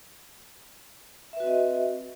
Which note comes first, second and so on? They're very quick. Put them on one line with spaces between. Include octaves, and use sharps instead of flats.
E5 B4 F#4 C4 D#5